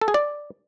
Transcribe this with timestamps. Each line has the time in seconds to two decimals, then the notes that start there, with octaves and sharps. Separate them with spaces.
0.01 A4
0.08 G#4
0.14 D5